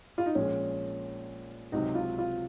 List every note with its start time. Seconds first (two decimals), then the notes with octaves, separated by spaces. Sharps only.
0.18 F4
0.26 D#4
0.35 A#1 A#2 G#3 C#4
1.72 C#2 C3 F#3 C4 D#4 F#4
1.95 F4
2.18 F4